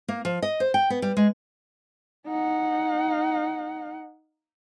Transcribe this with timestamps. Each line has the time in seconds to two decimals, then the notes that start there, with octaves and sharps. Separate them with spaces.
0.08 A#3
0.25 F3
0.42 D#5
0.60 C5
0.74 G5
0.90 B3
1.02 G3
1.17 G#3
2.27 D#4 F#5